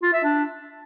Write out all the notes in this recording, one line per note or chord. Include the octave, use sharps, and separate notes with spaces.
F4
E5
D4